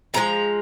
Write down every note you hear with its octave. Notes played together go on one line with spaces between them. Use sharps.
A#2 F3 G#3 A#5